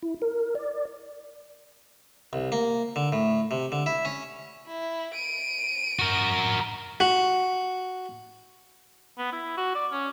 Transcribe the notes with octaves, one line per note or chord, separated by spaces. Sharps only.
E4
A#4
D5
C2
A#3
D3
A2
C3
D3
E4
C#4
E4
D7 D#7
F#4 A#4
F#4
B3
E4
F#4
D5
C#4